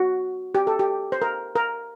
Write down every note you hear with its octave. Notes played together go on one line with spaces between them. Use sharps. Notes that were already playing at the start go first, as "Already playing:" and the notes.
Already playing: F#4
G4
A4
G4
C5
A#4
A#4